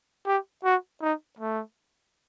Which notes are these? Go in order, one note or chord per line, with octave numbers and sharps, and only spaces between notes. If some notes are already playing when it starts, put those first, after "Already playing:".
G4
F#4
D#4
A3